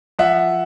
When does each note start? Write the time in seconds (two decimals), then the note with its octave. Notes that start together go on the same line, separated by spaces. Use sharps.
0.19 F3 E5 F#5